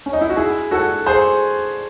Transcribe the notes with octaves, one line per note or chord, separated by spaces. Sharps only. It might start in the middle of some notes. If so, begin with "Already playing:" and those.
C#4
D#4
E4
F#4
E4 G#4
F#4 A4
G#4 C5